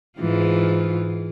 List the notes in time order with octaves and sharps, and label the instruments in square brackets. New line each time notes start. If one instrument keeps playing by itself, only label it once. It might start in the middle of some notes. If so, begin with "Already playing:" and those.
[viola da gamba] G#2 E3 F4